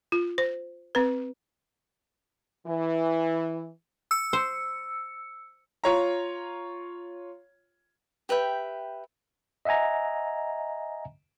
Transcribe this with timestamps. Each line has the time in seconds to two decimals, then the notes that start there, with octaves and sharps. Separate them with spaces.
0.12 F4
0.38 C5
0.95 C4 B4
2.67 E3
4.11 E6 C#7
4.33 C5
5.84 F4 C#5 A#5
8.29 G4 B4 E5 G5
9.65 D#5 E5 F#5 G#5 A#5